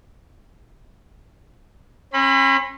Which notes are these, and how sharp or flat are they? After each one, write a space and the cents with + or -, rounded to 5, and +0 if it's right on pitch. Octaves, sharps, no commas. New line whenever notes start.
C#4 -40 B5 +25